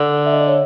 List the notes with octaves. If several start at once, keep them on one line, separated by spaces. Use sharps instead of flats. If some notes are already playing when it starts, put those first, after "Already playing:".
Already playing: D3
E5
D#5
D5
C#5